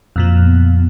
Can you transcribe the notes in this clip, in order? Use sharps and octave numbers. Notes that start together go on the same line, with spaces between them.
F2 A#2 F3
B3